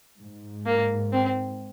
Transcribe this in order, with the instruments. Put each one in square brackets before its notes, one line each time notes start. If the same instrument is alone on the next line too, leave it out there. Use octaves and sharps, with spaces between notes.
[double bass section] G#2
[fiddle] A#3
C4